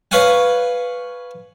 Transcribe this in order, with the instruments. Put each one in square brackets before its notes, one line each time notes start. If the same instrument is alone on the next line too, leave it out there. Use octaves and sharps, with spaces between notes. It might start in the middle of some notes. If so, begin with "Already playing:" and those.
[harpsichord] B4 C#5 F5 F#5 G#5